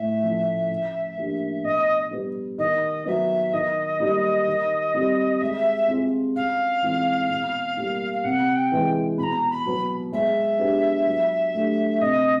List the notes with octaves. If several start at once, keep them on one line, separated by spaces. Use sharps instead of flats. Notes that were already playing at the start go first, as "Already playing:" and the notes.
Already playing: A2 E5
F3 A3 C#4
C#3
F3 A#3 D4 G4
B2 D#5
G3 B3
D#3 D#5
F#3 B3 E5
D#3 D#5
G3 A#3 D#4
D#3
G3 C4
G#3 E5
C4 F4 G#4
C#3 F5
E3 G#3 C4 F4
B2
G3 A#3
F5
C3 F#5
G5
E3 G#3
B2 A#5 B5
B5
F#3 B3
G#3 E5
B3 D4 G4
F#3
A3 D4 G4
C3 D#5